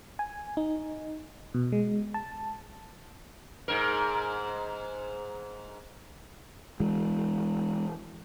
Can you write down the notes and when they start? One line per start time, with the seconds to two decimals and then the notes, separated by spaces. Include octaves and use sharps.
0.19 G#5
0.57 D#4
1.54 B2
1.72 G#3
2.14 A5
3.68 G#2 A#4
6.80 E3 G#3